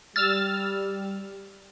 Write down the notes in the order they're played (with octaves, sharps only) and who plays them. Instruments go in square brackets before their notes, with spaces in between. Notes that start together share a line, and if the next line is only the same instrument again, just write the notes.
[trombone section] G3 [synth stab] E6 F6 A6